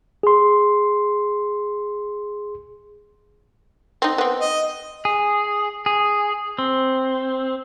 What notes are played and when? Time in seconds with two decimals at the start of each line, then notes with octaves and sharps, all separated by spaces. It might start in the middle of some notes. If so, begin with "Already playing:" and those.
0.23 G#4 C6
4.02 C4 D#4
4.18 B3 C4
4.41 D#5
5.05 G#4
5.86 G#4
6.58 C4